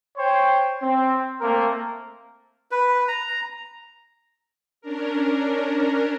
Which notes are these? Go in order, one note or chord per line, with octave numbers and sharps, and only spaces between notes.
C5 C#5 G5 C6
C4
A3 A#3 C4 A#4
B4
A#5
C#4 D4 A#4